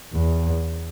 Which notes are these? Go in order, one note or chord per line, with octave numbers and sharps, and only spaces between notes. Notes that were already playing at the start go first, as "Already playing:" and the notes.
E2